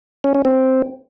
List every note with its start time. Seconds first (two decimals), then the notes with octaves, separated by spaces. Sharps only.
0.24 C#4
0.35 C#4
0.45 C4